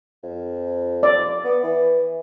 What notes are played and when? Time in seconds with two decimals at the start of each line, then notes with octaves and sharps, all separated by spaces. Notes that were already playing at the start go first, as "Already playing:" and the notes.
0.23 F2
1.03 D5
1.44 B3
1.63 E3